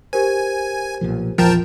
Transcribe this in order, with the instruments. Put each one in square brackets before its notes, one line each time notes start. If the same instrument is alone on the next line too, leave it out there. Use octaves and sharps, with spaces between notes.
[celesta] G4 A#4 C5 [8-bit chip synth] G#5
[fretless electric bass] B1 A#2 F3
[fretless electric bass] A#1 E2 [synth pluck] F3 [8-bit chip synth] A#4 G5 A5